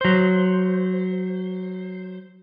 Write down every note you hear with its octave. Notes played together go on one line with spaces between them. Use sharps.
F#3 C5